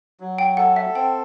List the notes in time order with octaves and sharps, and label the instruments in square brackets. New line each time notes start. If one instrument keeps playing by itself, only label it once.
[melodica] F#3
[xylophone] G5
[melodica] A4 [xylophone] F#5
[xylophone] E5
[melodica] C4 [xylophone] G5